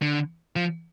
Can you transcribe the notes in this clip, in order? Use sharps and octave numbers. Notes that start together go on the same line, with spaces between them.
D3
F3